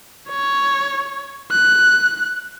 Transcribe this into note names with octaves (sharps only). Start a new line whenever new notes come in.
C#5
F#6